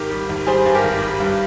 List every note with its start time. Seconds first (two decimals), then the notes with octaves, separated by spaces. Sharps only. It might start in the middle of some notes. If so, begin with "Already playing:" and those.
Already playing: G#1 G4 A#4
0.10 G3
0.29 G#1
0.47 G3 G#4 C5
0.66 G2
0.75 G4 A#4
0.84 G#1
1.02 G3
1.20 G2